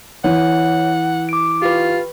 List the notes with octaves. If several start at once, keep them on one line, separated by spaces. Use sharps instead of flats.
E3 C#5 F#5
D6 D7
F4 G4 B4